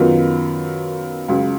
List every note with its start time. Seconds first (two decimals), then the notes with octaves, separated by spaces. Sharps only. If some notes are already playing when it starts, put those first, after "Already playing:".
Already playing: F#2 D#3 F#3 B3 F4
1.28 C#2 C#3 F#3